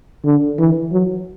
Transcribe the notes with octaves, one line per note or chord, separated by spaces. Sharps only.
D3
E3
F#3